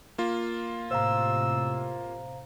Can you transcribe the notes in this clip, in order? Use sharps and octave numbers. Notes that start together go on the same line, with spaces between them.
A#3 F4
A2 C3 C5 F5 A#5 E6